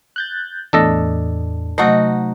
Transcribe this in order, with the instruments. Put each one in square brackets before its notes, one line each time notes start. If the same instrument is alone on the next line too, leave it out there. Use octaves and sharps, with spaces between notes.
[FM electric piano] F#6 G6 A6
[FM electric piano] E2 A2 [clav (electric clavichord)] D4 A4 D#5
[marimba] C3 F#3 A3 [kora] D#4 F#4